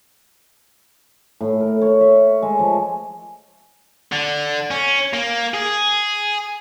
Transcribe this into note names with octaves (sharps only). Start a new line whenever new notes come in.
A2
A#4
C#5
E5
G#3
F3
D3
C#4
A#3
G#4